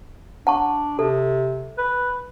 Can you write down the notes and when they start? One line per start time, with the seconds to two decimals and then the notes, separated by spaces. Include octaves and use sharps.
0.47 D4 F#5 A5 C#6
0.99 C3 A4
1.78 B4